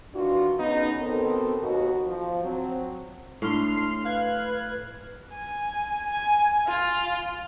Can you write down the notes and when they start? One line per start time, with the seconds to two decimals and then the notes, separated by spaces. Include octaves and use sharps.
0.14 D#3 E3 D4 F4 F#4
0.59 F#2 C#3 B3 C#4 D#4
1.01 B2 D#3 B3 C4 A4 A#4
1.60 D#2 B2 F#4
2.07 F3
2.43 F#3 C4
3.42 A2 D4 C6 F6 C7
4.05 B4 F5 F#6 G#6
5.31 G#5
6.10 G#5
6.68 F4